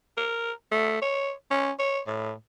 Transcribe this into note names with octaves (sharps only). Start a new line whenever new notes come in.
A#4
A3
C#5
C#4
C#5
A2